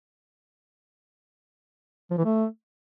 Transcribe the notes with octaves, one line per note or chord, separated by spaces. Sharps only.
F3
E3
A3